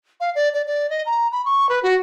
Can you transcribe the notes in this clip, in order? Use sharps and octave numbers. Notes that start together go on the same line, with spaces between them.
F5
D5
D5
D5
D#5
A#5
B5
C#6
B4
F#4